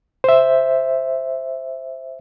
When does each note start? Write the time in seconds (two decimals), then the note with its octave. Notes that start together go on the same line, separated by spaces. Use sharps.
0.24 C5 E5